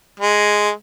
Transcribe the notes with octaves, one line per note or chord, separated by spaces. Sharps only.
G#3